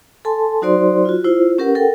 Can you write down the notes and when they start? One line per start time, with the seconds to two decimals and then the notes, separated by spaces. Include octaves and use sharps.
0.25 A4 G#5 A5 C6
0.62 F#3 D#4 F#4 C5 D5 C6
1.05 F4 F#4
1.24 E4 F4 C5
1.58 C#4 G4 A#4 B4 F#5
1.75 A4 A#4 F#5 G5